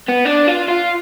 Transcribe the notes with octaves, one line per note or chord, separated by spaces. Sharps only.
B3
D4
F4
F4